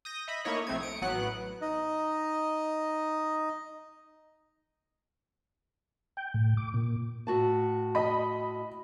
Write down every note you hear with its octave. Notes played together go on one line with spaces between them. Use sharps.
D#6 G6 A#6
D#5 E5 B5
A3 A#3 D#4 E4 C#5 D#5
B1 A3 C4 G#6
D#6 C#7 D7
A1 F#3 B3 F#5 F#6
D#4 D#5
G5
A2
D6
A#2
A2 F#4 A5
D#5 B5